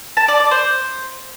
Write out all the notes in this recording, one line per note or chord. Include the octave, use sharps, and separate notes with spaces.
A5
D5
D5
C5